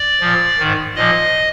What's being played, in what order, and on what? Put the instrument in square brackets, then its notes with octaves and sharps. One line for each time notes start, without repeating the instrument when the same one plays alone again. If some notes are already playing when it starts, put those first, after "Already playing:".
Already playing: [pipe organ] D5
A#2 F3
G#2 D#3
A#2 F3 D#5